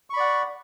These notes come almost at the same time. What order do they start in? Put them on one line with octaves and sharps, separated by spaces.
C#6 B5 D5 F#5